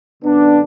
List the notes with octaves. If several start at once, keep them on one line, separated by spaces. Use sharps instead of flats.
F#2 D3 B3 D4